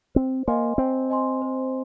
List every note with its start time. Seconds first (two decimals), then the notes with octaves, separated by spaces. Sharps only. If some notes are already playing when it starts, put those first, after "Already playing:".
0.15 C4 C5
0.48 A#3 D#5 G#5 C6
0.78 C4 C5
1.10 D#5 G#5 C6
1.42 C5